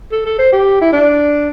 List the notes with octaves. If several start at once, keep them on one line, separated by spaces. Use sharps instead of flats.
A4
A4
C5
G4
E4
D4